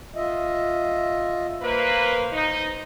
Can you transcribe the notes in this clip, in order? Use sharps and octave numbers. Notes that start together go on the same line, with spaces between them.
F4 D#5 E5
A#3 B4 C5
D#4